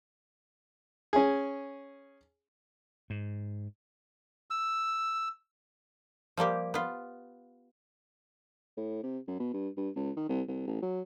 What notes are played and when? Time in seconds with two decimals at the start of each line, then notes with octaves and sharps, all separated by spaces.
1.13 C#4 G#4
3.10 G#2
4.50 E6
6.37 F3 G3 A#3 G4
6.74 B3 F4
8.77 A2
9.03 C3
9.27 F#2
9.39 B2
9.53 G2
9.77 G2
9.96 C#2
10.17 D#3
10.29 C2
10.48 C2
10.67 A1
10.82 F#3